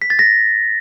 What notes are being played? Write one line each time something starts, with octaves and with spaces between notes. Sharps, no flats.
B6
A6
A#6